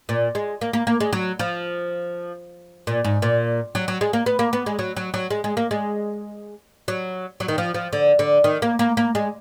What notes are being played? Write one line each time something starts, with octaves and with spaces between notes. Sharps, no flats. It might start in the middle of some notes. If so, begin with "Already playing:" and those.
A#2
G#3
A#3
A#3
A#3
G#3
F#3
F3
A#2
G#2
A#2
F#3
F#3
G#3
A#3
B3
A#3
B3
G#3
F#3
F#3
F#3
G#3
G#3
A#3
G#3
F#3
F#3
D#3
F3
F3
D3
D3
D#3
A#3
A#3
A#3
G#3